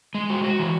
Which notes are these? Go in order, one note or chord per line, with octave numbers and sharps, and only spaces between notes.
G#3
F#4
F#4
E3